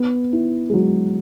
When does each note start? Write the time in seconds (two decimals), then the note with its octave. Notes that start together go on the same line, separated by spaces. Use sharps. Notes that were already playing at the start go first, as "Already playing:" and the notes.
Already playing: B3
0.33 E4
0.69 G#3
0.73 F#3